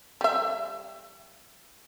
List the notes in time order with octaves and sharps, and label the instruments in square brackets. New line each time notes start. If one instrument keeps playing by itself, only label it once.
[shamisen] G3 E5